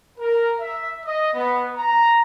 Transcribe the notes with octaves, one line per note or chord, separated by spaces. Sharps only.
A#4
E5
D#5
B3
A#5